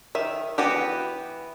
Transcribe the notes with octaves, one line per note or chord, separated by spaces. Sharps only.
D#3 E5
E3 B3 F#4 G4